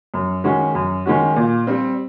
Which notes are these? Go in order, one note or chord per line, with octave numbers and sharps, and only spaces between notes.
F#2
D#3 G#3 C#4 F#4
F#2
D#3 G#3 C#4 F#4
A#2
G3 C4